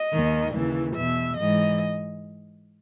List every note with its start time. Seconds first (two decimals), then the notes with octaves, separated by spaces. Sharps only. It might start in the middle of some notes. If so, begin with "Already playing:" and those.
Already playing: D#5
0.12 D#2 D#3
0.54 D#2 C#3 E3
0.96 E2 B2 E5
1.38 G#2 E3 D#5